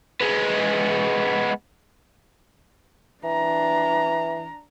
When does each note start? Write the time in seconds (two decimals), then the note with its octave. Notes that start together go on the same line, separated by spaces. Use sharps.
0.21 G#3 B3
3.24 E3 D4 A#5